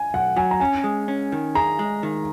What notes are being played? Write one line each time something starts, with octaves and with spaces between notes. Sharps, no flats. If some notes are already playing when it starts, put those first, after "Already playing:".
Already playing: G#5
B1 F#5
F#3 G#5
A#5
C#4 G#5
G#3
C#4
D#3
G#4 A#5
G#3
D#3